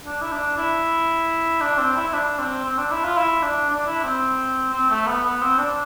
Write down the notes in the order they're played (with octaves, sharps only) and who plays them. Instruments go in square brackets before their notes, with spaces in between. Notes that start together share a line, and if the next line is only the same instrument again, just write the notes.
[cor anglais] D4
E4
D4
E4
D4
C4
E4
E4
D4
C4
C4
D4
E4
F4
E4
D4
D4
E4
C4
C4
A3
B3
B3
C4
D4